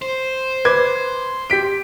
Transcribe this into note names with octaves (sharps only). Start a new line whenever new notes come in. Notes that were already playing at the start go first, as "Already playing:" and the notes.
C5
B4 D6 G#6
G4 B6 D7